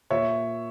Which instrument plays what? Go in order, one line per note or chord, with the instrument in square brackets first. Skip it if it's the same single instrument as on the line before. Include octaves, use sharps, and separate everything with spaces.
[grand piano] A#2 C#5 E5